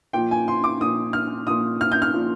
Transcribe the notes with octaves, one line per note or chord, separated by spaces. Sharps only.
A#2 F3 G5
G#5
C6
D6
A#2 F3 D#6
F6
A#2 F3 D#6
F6
G6
F6
A#2 F3